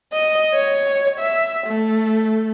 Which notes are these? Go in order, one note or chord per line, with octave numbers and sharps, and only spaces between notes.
D#5
C#5
E5
A3